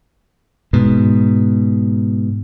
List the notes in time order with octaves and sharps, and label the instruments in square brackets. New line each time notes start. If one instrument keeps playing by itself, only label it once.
[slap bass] G#2 B2